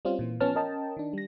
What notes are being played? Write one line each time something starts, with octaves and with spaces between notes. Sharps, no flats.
G3 C4 C#4 F4
A#2 E3
F3 B3 C#4 A5 F6
C#4 A#4 D#5 G5 A5
D#3 D4
G3 A#6